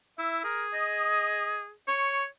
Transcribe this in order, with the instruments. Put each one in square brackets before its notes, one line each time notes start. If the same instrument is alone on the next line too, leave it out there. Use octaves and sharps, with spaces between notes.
[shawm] E4 [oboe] E5
[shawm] G#4 [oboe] A#4
[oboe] D#5
[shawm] C#5 [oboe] C#6